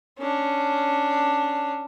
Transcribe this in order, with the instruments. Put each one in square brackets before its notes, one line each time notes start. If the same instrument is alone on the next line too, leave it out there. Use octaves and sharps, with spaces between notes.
[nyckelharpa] C#4 D4